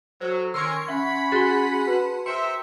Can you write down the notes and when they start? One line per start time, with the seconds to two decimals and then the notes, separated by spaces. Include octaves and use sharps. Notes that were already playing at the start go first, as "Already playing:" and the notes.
0.21 F#3 A4 C5
0.54 D#3 C#4 A#4 C6 C#6 E6 G#6
0.88 C#4 E5 F#5 B5
1.32 F#4 G#4 C6 A6 G7
1.87 B4 A5
2.26 A#4 C5 E5 G5 C6 C#7